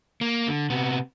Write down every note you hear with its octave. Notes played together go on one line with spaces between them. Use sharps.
A#3
D3
C3 B3